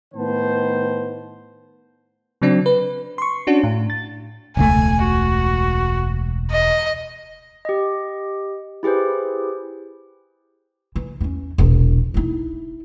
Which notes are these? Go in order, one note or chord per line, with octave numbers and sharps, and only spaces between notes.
A2 D#3 B3 C5 A5
C#3 F#3 C4 D4
B4
C6 C#6
C#4 D4 F#4
A2
A6
E1 C#2 A3 G#5
F#4
D#5
G4 D#5
E4 G4 G#4 B4 C5
E3
E2 C#4
E1 A#1
D#4 E4